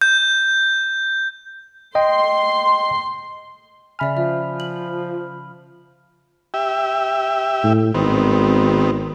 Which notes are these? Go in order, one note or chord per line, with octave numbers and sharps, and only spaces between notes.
G6
D#5 G5 C6
C#3 D5 E5 G#5 B5 F6
F3 D5 E5
F#7
G4 E5
A2
G#1 D#3 B3 C4